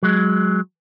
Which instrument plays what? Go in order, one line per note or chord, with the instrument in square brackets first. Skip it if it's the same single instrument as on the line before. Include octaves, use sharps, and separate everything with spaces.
[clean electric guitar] F#3 G#3